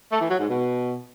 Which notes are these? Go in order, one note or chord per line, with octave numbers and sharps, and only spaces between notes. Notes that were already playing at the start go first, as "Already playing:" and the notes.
A3
E3
F#3
G#2
B2